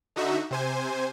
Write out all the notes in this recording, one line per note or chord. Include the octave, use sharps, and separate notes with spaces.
D3 D#4 F#4 E5
C3 C5 G#5